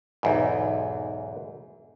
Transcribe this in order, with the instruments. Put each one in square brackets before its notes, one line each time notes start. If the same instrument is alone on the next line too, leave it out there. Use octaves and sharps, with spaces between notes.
[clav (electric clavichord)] B1 E2 G#2